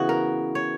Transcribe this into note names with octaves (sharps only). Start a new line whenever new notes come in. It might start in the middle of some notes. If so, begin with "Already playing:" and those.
Already playing: C#3 E3 B3 F#4
A#4
C#5